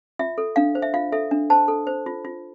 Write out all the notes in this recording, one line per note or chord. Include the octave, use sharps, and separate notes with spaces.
F4 E5
A4
D4 F5
C5
E5
F4 F5
A4 E5
D4
C5 A5
A4
C5
F4
F4